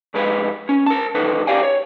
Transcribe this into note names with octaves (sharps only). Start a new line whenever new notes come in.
F2 G#2 G#3 B4
C#4
A#4 A5
B1 E2 D#3 A4 B4
G4 D5 F5 G5 G#5
C#5